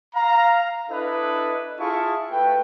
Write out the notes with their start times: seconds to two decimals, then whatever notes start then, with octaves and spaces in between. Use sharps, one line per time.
0.14 F5 A#5
0.90 D4 E4 A4 B4 D#5
1.79 E4 F4 G#4 F5 A5 C#6
2.30 A3 B4 G5